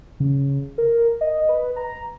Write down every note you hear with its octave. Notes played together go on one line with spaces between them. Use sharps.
C#3
A#4
D#5
B4
A#5